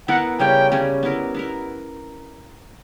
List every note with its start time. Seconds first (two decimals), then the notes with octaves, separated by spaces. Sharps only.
0.08 B3 E4 A#4 F#5
0.40 C#3 G3 C#4 G5
0.72 C#3 G3 C#4
1.03 B3 E4 A#4
1.35 B3 E4 A#4